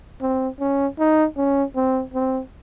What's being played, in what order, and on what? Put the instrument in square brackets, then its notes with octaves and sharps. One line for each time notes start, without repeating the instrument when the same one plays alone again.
[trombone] C4
C#4
D#4
C#4
C4
C4